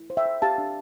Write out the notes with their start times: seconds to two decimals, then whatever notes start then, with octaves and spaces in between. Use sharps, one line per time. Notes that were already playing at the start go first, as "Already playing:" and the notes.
Already playing: E4
0.10 C5
0.17 E5 G5
0.26 C5
0.42 G4 F5 A5
0.58 D4